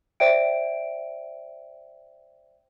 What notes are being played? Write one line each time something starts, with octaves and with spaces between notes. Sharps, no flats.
C5 D5 E5 G5 D7